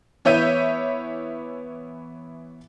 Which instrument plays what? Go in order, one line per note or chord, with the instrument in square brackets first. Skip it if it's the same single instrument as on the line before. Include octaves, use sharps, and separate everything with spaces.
[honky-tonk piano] E3 B3 C#5 E5 G6 D#7